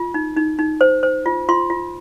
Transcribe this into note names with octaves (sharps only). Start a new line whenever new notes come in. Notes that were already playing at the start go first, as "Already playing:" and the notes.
Already playing: F4
D#4
D#4
D#4
C5
C5
F4
F4 C6
F4